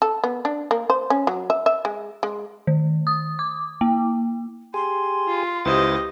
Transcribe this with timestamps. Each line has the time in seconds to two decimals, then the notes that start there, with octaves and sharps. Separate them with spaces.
0.02 A4
0.24 B3
0.45 D4
0.71 A#3
0.90 C5
1.10 C#4
1.27 F#3
1.50 E5
1.66 E5
1.85 G#3
2.23 G#3
2.67 D#3
3.07 D#6
3.39 D6
3.81 A#3
4.74 G4 G#4 G#5 C6
5.27 F4
5.65 C#2 E4 G4 B4 C5 D#5 A6